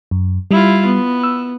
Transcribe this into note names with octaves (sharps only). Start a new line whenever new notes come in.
F#2
G3 E4 F4
B3
E6